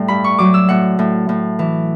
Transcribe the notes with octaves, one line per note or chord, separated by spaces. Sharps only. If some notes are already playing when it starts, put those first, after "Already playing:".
Already playing: A2 G3 G5
G2 B5
C#6
F#3 D6
E6
A2 F#5
A2
A2
E3